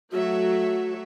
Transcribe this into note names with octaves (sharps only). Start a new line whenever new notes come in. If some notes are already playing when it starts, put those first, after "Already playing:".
F#3 A3 F#4 E5